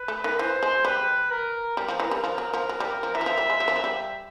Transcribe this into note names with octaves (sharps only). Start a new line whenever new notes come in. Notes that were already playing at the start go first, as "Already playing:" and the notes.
Already playing: B4
A3
D#3
E3 C5
G#3
G3 B4
A#4
G3 A#4
F3
E3
G3
F3 A#4
F#3
F3
F#3
G3
F3
E3 E5
F#3
F3
G3
G#3
F#3
F3
F#3
G3